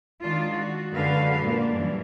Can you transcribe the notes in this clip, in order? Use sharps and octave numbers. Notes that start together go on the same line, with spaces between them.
D#3 G#3 D4 F4
F#4
F#2 D3 G#3 F#4 B4 F5
A#2 A#3 D4
F#2 E3 G3